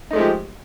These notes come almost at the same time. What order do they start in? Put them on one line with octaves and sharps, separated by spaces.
D#4 A3 G#3 F3 G4